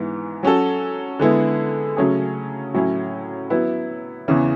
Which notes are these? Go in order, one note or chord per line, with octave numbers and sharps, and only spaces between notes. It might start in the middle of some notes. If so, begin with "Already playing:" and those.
Already playing: G#2 E3 B3
F#3 C#4 F#4 A4
D3 G#3 B3 E4
C#3 F#3 A3 C#4 G#4
A2 F#3 C#4 E4
F#3 B3 E4 B4
E2 C#3 E3